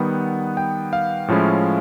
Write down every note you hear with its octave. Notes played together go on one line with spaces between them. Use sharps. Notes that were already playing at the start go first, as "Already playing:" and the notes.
Already playing: D#3 G3 B3 F#5
G5
F5
A2 F3 G#3 C#4 E4